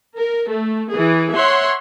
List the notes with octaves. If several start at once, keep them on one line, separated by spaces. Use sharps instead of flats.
A#4
A3
E3 G#4
C#5 E5 F#5 C6